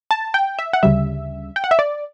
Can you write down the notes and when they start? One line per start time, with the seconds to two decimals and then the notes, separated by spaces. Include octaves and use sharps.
0.11 A5
0.34 G5
0.59 E5
0.73 F#5
0.83 D2 C#3 G3 E5
1.56 G5
1.64 F#5
1.71 E5
1.79 D5